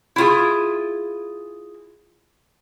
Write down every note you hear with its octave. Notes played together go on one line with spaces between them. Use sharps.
E4 F4 G#4